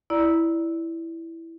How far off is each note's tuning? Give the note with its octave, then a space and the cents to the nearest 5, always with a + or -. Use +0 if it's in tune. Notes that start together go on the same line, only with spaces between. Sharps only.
E4 +0 D5 +0 A#5 +15